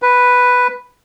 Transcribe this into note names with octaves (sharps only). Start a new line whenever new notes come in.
B4